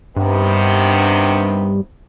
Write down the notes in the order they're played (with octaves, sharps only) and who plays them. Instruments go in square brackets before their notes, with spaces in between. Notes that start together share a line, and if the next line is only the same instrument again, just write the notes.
[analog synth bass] G2 [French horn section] C3 D#3 B3